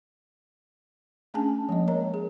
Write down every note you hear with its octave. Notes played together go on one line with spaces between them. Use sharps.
A3 C#4 D4 G#4 G#5 A5
F3 G#3 A#3 D#5
A#4 C#5 D#5 A#5
G#4